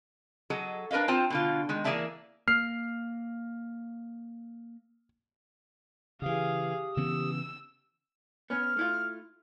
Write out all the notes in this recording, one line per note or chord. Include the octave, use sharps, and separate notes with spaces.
F#3 G#4 A4 D#5
D4 A#4 B4 D#5 F5
C4 F4 C5 G5 A5
B2 D3 F4
D#3 G#3
E3 A#3 G#4 D5 E5 A5
A#3 F6 C7
C#3 E3 G4 G#4 F5 D#6
C#3 E3 B3 E6
B3 C#4 F6
A3 E4 F4